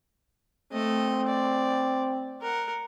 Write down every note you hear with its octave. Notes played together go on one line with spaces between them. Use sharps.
A3 C4 D#5
D5
A#4 F#5